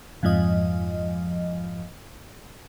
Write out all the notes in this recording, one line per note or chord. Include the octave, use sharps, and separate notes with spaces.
F2 G#2 F3 D#5